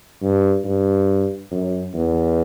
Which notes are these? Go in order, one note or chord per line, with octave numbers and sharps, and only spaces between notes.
G2
G2
F#2
E2